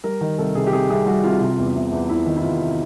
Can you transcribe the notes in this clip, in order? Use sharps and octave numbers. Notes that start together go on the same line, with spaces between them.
G3 A#4
D#3
C2 A4
C3 G#4
G4
C3 G#4
C2 G#4
G3 F#4
C2 F4
C3 F4
E2
C3
E2
E2 E4
D#3
E4
E2 F4